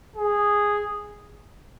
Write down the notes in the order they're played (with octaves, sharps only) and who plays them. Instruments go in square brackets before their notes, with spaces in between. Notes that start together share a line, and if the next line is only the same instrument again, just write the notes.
[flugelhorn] G#4